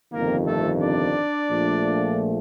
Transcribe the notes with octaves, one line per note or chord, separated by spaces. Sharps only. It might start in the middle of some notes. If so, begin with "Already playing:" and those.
G1 F2 C3 D#3 A#3 A#4
A3 A4
D4 D5
A#1 A#2 F3 A3